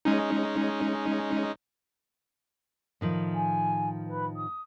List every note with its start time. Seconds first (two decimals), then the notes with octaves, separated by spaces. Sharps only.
0.05 G#3 C#4 D#4
3.01 A2 D#3 F3
3.34 G#5
4.07 B4
4.36 D#6